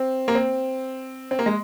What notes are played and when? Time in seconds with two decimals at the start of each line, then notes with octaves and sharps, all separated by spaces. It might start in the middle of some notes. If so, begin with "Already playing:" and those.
Already playing: C4
0.28 A#3
0.35 C4
1.31 C4
1.39 A#3
1.46 G#3